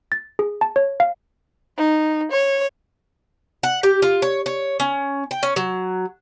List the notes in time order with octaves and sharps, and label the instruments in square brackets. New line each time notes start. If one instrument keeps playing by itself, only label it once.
[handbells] A6
G#4
A5
C#5
F5
[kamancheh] D#4
C#5
[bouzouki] F#5
G4
F4
C#5
C#5
C#4
G5
C#4
F#3